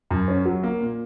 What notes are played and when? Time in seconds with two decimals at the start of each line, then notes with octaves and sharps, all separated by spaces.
0.11 F#2
0.28 C#4
0.45 F#3
0.63 A#3
0.80 A#2